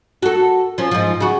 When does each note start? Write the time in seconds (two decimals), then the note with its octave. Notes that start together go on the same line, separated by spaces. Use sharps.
0.22 F#4 A4
0.78 F3 C#4
0.91 G#2 F3
1.20 C#3 F#4